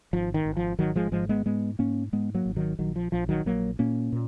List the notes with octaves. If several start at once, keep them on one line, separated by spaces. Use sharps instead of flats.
G#1 F3
D#3
G#1
F3
G#1 D#3 F#3
F3 G#3
G#2 F3 G#3
G#3 B3
G#2 G#3 B3
G#2 A#3 C#4
G#2 G#3 B3
F#3 A#3
G#1
D#3 F#3
A#1 D#3 F#3
F3
A#1 F3
D#3 F#3
A#1 F#3 A#3
A#2 A#3 C#4
A#2